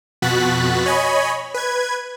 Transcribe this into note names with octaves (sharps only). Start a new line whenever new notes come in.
F2 B2 F#4 F#6 A6 B6
C#5 D#5 G#5 B5
B4 G#6